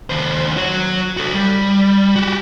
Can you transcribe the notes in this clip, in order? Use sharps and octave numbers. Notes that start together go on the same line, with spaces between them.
D#2 C5
F#4 C#5
F#4 A4
G3
F#4 G4